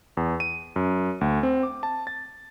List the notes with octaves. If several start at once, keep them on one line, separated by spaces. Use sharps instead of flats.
E2
D#7
F#2
D2
C4
D6
A5
A6